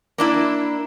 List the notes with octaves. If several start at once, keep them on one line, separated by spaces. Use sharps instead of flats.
A#3 D4 E4